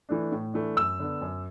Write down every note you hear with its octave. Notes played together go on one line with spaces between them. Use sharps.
E3 A3 D4
A2
E3 A3 D4
F#2 E6
D3 B3 D4
F#2